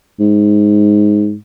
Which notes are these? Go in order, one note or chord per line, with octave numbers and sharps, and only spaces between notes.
G#2